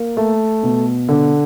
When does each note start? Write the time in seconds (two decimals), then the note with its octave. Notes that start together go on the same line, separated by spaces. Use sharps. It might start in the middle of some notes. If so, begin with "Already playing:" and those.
Already playing: A#3
0.17 A3
0.63 B2
1.09 D3